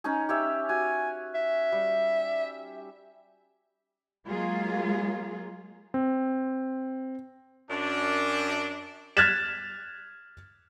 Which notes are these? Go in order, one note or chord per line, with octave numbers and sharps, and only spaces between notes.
C#4 D#4 G#4
G4 C#5 E5
F#4 G#5
E5
G3
F#3 G#3 A#3 F4 G#4
C4
F#2 D4
F6 F#6 G#6 A6 B6 E7